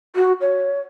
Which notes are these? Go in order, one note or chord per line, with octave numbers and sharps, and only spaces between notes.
F#4
C#5